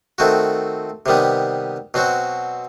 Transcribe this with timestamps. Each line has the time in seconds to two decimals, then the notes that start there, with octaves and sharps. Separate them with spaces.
0.18 D#3 A3 C4 F#4
1.06 C3 D#3 G3 B3
1.94 B2 F#3 C4 F#4